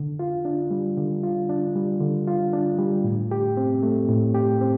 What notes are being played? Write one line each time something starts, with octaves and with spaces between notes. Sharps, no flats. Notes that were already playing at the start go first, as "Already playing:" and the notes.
Already playing: D3
F4
D4
G3
D3
F4
D4
G3
D3
F4
D4
G3
A2
G4
C4
A3
A2
G4
C4